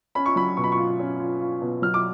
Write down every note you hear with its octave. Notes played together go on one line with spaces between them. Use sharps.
C#4 B5
C#6
F#3 B5
B2 C#6
B5
C#6
F4
C#4
F4
F4
B2
F#3 F6
D6